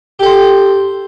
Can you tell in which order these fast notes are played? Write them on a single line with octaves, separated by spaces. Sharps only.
G4 A4 C5